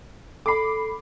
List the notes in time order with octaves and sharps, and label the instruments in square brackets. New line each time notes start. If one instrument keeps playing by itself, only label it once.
[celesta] A4 C7 [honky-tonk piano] B5 D6